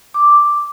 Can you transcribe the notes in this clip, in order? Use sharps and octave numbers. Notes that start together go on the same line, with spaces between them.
D6